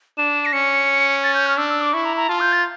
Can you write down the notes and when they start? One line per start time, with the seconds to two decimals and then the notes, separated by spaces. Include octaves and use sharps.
0.18 D4 E7
0.46 A#6
0.53 C#4 C#7
1.24 A6
1.34 G6
1.46 F6
1.58 D4 E6
1.70 E6
1.81 D6
1.94 E4 C#6
2.05 A#5
2.17 A#5
2.29 F4 A5
2.40 G6
2.52 A6